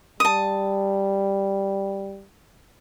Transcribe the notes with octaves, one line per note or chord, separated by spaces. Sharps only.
G3 A5 D#6